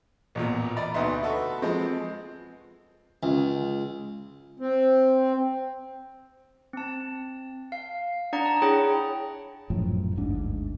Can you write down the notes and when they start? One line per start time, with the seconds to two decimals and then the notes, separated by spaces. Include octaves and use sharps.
0.35 A1 E2 A#2
0.77 D5 D#5 A#5 B5
0.94 D2 B2 D#4 B4 E5 C6
1.23 F#4 A4 B4 C#6
1.62 F3 G#3 C4
3.23 C#2
4.59 C4
6.73 C4 A5
7.72 F5
8.33 D4 D5 F#5 A#5
8.46 A5
8.62 E4 G#4 C#5 G5 A#5
9.70 A#1 F#2 A2 F3
10.15 G1 D2 G#2 D4